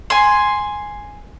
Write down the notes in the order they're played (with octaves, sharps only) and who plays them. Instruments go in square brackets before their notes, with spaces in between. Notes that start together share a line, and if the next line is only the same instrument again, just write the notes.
[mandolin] G#5 C6